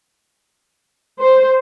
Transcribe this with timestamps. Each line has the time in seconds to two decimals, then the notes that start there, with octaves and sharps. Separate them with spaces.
1.20 C5